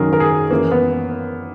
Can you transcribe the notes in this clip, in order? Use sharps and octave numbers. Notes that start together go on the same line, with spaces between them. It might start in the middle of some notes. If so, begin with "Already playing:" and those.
Already playing: F#2 D#3 F#3 G#4 A#4
A#4
G#4
F#2 E3 A#3
B3